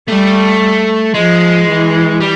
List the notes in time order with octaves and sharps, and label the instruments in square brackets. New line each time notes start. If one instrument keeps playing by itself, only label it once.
[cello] G3 [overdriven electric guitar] A3
[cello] F3 [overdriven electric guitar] G#3
[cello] E3
[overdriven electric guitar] G3